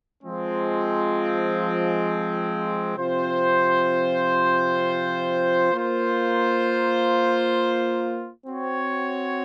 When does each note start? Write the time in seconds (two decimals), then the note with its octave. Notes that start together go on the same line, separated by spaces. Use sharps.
0.22 F3 G#3 C4
2.96 C3 F3 C4 F4 C5
5.72 A#3 F4 C5
8.46 C4 F#4 C#5